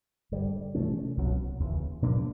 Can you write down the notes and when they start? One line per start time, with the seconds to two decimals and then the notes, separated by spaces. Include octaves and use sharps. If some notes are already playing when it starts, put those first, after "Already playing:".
0.32 G2 D3 G3
0.75 C3 E3 A3 C#4
1.17 C2 B2 F#3
1.60 D#2 C#3 E3
2.02 B2 F#3 A#3 D4